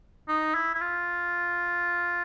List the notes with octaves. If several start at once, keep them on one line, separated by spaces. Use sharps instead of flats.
D#4
E4
E4
F4